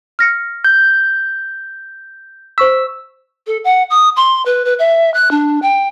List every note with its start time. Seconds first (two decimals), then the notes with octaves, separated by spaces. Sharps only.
0.19 F6 A#6 C#7
0.64 G6
2.58 C5 C#6 E6 B6
3.47 A4
3.64 F#5
3.90 D#6
4.16 C6
4.46 B4
4.65 B4
4.79 E5
5.14 F#6
5.31 D4
5.62 G5